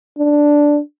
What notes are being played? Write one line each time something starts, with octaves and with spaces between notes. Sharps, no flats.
D4